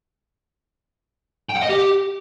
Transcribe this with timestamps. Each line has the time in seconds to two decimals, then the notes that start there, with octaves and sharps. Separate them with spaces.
1.49 G5
1.56 F#5
1.63 D#5
1.69 G4